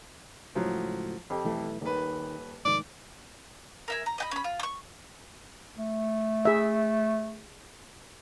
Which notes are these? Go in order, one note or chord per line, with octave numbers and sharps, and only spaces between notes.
C#2 A2 F3 F#3
F2 G4
B1 E3 A3
D#1 D#3 B4
F1 G#2 D#3 D5
A#4 E5 G#5
A#5
D#5 G5 B5
C#4 B5
F4
C#6 E6
A3
G#4 E5